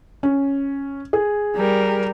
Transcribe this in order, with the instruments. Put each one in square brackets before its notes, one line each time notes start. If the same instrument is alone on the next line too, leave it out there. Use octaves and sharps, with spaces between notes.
[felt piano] C#4
G#4
[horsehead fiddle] G3 A#4